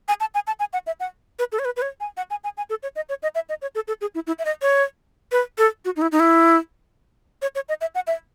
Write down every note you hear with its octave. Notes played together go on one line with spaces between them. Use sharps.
G#5
A5
G#5
A5
G#5
F#5
E5
F#5
B4
A4
C#5
B4
B4
C#5
G#5
F#5
G#5
G#5
G#5
A4
C#5
D#5
C#5
D#5
E5
D#5
C#5
A4
A4
G#4
E4
E4
E5
D#5
C#5
B4
A4
F#4
D#4
E4
D#4
E4
C#5
C#5
D#5
E5
F#5
E5